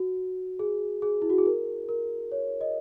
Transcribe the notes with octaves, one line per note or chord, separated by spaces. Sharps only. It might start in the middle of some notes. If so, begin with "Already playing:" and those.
Already playing: F#4
G#4
G#4
E4
F#4
G#4
A#4
A#4
C#5
D#5